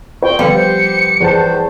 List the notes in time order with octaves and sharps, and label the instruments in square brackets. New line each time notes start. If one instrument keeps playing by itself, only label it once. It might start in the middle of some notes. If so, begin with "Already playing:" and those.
[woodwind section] A#2 C#6 [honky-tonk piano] C5 [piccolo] G5
[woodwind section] D3 [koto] F3 G3 [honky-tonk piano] B3 [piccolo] C#7
[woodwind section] G4 C5
[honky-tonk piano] E2 A5 [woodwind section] G4 B4 C5